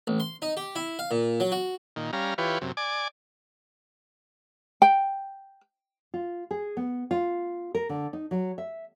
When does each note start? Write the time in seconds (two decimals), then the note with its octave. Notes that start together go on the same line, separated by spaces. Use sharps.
0.07 A1
0.20 C6
0.42 D#4
0.57 G4
0.76 E4
0.99 F5
1.11 A#2
1.40 F#3
1.52 F#4
1.96 A#2 D#3
2.13 G3 C#4 F5 A#5
2.38 E3 F4 G4 B4 C#5
2.61 F#2 C3
2.77 D5 G#5 D6
4.82 G5
6.14 F4
6.51 G#4
6.77 B3
7.11 F4
7.75 A#4
7.89 D3
8.13 D#4
8.31 F#3
8.58 E5